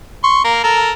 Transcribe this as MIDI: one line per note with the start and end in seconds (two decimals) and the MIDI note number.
0.24 0.40 84
0.24 0.40 85
0.44 0.63 58
0.44 0.63 70
0.64 0.92 69
0.64 0.92 70
0.64 0.92 82